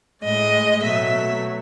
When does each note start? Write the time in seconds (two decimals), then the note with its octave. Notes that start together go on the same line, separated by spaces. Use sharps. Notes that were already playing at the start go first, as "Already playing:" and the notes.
0.23 A2 G#3 D#5
0.83 B2 F#3 A3 E5